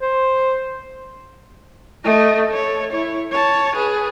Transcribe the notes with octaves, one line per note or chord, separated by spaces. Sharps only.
C5
A3 D#5
A4 C#5
E4 C#5
C#5 A5
G#4 B4